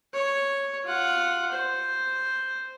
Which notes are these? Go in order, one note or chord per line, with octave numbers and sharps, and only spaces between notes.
C#5
F4 F#5
C5